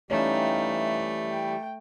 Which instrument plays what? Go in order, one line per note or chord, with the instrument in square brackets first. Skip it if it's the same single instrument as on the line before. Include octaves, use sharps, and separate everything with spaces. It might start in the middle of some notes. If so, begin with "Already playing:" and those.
[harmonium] E3 G3 G4 [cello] A3 [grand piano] C#4 [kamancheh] D#4 F5
[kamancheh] G5